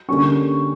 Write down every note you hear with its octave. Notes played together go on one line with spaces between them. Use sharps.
D3 G3 A#3 C#4 C#6